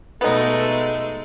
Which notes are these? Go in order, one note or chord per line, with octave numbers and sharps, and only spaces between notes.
B2 G#3 A3 B3 D#4 A4